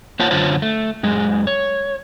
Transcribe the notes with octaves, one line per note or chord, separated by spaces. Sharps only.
A#3 F4 C5 C#5 F#5 A5
F#2 D3 F4 C5 C#5 A5
A3
F#2 G#3 G#4
C#5